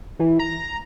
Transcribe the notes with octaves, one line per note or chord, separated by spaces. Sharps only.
E3
A#5